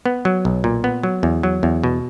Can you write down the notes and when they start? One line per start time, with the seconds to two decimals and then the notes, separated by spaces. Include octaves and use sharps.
0.06 B3
0.25 F#3
0.45 B1
0.64 A#2
0.84 B3
1.03 F#3
1.23 E2
1.43 F#3
1.63 E2
1.84 B2